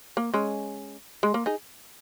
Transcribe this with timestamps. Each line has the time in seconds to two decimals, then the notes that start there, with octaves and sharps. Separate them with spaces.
0.17 A#3
0.34 G#3 C#4
1.23 G#3
1.34 A#3
1.46 D#4 G#4